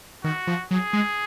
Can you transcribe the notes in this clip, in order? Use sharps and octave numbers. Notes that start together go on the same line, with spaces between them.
D#3 F#4
F3
F#3 G#4
G#3